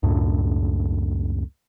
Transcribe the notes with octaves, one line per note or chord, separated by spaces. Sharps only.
C#2 F#2 A2 D4